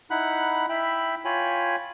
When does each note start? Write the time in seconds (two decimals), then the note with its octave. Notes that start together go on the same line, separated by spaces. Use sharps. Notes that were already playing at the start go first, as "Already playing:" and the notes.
0.10 D#4 E4 F#5 B5 F#6
0.69 E4 E5 G5 B5
1.25 F4 C#5 G5 G#5 B5